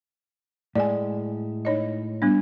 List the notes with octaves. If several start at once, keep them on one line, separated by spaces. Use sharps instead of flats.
A2 G#3 D5 G#5
D#4 C#5 D#5
G3 B3 D4